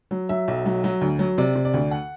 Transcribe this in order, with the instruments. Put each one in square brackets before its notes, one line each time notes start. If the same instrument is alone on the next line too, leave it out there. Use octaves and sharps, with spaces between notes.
[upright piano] F#3
F#3 E5
B1
F#3
F#3
D2
F#3
C3 D5
C3
D5
D2
F#5